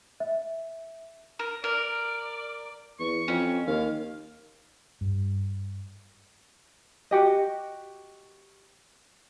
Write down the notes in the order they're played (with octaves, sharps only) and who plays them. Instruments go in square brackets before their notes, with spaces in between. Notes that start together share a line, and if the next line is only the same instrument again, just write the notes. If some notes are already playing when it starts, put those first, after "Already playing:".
[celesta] E5
[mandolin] A#4
[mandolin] A#4 [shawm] D5
[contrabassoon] E2 [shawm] C#6
[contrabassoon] F2 [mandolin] C#4
[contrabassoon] D#2 [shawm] F5
[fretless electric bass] G2
[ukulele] F#4 G4 D#5